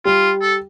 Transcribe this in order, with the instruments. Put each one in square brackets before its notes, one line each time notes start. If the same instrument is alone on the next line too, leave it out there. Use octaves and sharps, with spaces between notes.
[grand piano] G3 [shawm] F4
[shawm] A4